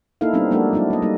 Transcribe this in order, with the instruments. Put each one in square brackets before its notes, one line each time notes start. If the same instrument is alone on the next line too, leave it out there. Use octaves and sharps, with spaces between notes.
[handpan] A#3 D#4 E4 A4 F5
G3 B3 C4 D4 D#4
F#3 G#3 A#3 D4 F#4 A4
F#3 D4 E4
A#3 D#5
G3 A3 D#4